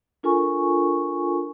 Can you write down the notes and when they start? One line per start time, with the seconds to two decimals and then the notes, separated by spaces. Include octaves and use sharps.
0.23 D4 F4 A4 A#4 G#5 C#6